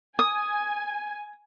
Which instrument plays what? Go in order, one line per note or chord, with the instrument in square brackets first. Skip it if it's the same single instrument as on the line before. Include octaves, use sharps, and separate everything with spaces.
[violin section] G#5 [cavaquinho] D#6